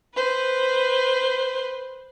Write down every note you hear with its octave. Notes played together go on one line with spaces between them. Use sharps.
B4 C5